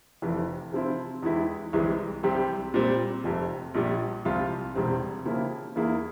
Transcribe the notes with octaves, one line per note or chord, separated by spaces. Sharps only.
F1 F2 C3 E3
C3 F3 C4 E4
E2 E3 G#3 E4 G4
C2 C3 E3 G#3
C2 C3 G3 C4 G4
A#2 G3 C4
F1 F2 C3
A#1 A#2 G3
C2 C3 F3 C4 F4
E1 E2 C3 G3 C4
C#3 F3 A#3 E4 G4
E2 E3 A#3 E4 G#4